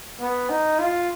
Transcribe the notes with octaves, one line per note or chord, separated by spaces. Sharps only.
B3
D#4
F4